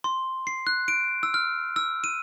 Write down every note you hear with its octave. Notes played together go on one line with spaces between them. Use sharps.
C6
C7
F#6
D7
E6
F6
E6
D#7